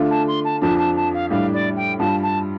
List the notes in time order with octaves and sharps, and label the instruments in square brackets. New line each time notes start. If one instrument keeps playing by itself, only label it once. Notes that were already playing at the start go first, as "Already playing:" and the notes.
Already playing: [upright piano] D3 A3 D4 F4
[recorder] A5
C6
A5
[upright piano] F2 F3 D4 [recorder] A5
[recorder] A5
A5
F5
[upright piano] A2 G3 D4 [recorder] F5
[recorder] D5
G5
[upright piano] G2 G3 F4 [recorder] A5
[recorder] A5